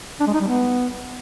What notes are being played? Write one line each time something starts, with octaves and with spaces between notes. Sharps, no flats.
D4
G#3
D#4
G3
B3